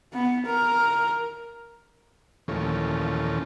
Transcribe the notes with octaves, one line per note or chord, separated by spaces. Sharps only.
B3
A#4
D#2 A#2 E3 F3 A3 C#4